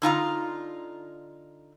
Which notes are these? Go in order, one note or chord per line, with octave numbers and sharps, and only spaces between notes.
D3 D#4 F4 A#5